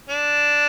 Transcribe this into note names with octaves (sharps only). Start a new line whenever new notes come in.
D4